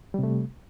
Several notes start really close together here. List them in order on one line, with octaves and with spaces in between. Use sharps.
G3 C3 A3